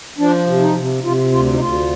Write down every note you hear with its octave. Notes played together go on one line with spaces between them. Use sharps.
F3 D4
C3
D#4
C3
C3 F4
D2 F4
D#4
D2 F4